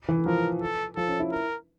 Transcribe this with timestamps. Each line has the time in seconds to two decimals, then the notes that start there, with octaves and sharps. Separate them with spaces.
0.09 E3
0.26 F3 A#4
0.62 A4
0.96 F3 A4
1.08 C#4
1.20 E4
1.31 A#4